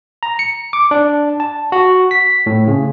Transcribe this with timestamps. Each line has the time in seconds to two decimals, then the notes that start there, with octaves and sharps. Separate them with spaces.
0.23 A#5
0.39 C#7
0.73 D6
0.91 D4
1.40 A5
1.72 F#4
2.11 B6
2.46 A2
2.67 C#3